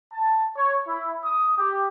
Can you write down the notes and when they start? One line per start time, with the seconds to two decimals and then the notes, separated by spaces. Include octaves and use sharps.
0.13 A5
0.56 C#5
0.87 E4
1.24 D#6
1.58 G4